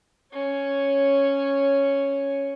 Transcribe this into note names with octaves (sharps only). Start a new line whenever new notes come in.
C#4 C#5